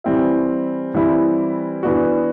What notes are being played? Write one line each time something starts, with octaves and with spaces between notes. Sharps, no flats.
E3 G3 C4 E4
E3 G3 C4 E4
E3 B3 D4 F#4